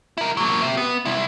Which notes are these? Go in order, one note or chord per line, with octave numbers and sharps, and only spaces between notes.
E4 A#4
F#3 A#3
G4 E5
B3
C2 E4